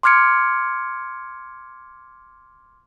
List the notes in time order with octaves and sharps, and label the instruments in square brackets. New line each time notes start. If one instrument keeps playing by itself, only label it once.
[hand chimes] C6 D6 F6 G#6 C#7 D7